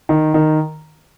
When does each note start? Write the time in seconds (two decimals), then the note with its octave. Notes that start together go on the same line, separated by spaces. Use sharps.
0.09 D#3
0.34 D#3